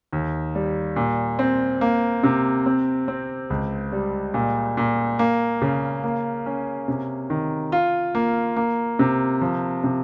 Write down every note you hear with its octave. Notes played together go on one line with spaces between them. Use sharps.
D#2
G3
A#2
C4
A#3
C3
C4
C4
C#2
G3
A#2
A#2
A#3
C#3
A#3
C#4
C3
D#3
F4
A#3
A#3
C3
F3
C3